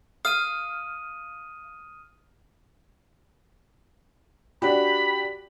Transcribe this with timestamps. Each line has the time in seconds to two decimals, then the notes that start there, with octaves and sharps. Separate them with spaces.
0.25 F5 D#6 F6 D#7
4.62 D4 F#4 G4 B5